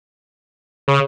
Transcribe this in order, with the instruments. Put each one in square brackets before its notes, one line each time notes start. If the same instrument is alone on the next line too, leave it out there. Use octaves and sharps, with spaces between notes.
[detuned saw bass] C#3